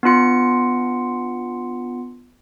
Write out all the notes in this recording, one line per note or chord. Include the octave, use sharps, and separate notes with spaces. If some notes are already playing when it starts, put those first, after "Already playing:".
B3 D4 F4 C#7